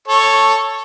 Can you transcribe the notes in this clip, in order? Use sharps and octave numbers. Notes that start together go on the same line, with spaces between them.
A4 C#5